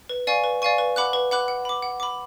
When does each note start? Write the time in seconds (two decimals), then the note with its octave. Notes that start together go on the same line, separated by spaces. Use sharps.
0.09 B4
0.27 D5 F5 G#5 C#6
0.44 B4
0.62 D5 F5 G#5 C#6
0.78 B4
0.96 F#5 B5 D6 F#6
1.13 B4
1.31 F#5 B5 D6 F#6
1.48 F#5
1.65 B5 D6
1.82 F#5
2.00 B5 D6